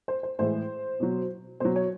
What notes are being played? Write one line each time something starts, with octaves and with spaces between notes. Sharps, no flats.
C5
C5
A2 E3 G#3 C5
B2 F#3
B2 F#3 C5
C#5